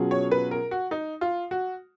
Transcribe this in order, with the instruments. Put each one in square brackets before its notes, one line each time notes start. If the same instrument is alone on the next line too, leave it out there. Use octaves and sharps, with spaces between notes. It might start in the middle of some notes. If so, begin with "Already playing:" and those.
Already playing: [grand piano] B2 F#3 C#4 F4 G#4
[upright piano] C#5
B4
A#4
F#4
D#4
F4
F#4